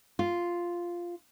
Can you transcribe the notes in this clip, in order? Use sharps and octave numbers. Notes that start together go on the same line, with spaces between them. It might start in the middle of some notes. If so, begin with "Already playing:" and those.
F4